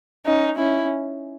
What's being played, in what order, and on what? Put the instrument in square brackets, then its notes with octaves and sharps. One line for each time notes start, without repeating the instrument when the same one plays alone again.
[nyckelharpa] C#4 [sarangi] D#4
[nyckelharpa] C#4 [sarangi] E4